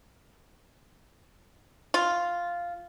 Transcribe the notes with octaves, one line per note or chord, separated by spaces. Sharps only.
F4